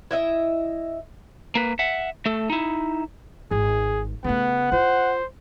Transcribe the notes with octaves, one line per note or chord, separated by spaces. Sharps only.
E4 D#5 E5
A#3 B4
E5 F#5
A3 A4
D#4 E4
G#1 G#4
C#3 A3 B3 F#5
F4 C5